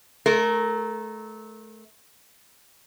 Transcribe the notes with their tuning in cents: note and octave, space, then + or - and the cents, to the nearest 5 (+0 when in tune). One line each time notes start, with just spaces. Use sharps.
A3 -25 A#4 +0